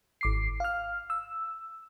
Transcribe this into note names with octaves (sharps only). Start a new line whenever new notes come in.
G#1 D6 C7
F5 F6
E6